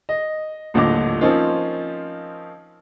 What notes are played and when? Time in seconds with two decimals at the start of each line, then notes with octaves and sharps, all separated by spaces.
0.09 D#5
0.74 D#1 A#1 A2 D3 D#5 D6
1.21 F3 A#3 C4 C#4 D#4 F4